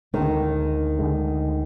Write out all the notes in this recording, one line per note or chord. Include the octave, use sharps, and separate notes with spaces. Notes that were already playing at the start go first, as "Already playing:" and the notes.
D2 D3 D#3 G#3
D2 D3 G#3